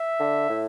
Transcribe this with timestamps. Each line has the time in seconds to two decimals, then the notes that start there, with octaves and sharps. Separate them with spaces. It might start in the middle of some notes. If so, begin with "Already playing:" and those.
Already playing: E5
0.20 D3
0.49 A2